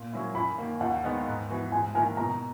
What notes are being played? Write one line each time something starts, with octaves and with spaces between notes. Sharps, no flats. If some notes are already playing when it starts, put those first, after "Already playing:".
Already playing: A#2
F#3 A#3 C#4 E4
F#2 B5
D#3 A#3
D#2 F#5
D#3 G#3 B3 D#4
G#2
E3 B3 F#4
G#2 G#5
D#3 A#3 E4 A#4 G#5
B2 A#5